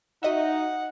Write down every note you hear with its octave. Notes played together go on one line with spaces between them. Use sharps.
D#4 F#4 D#5 E5 F#5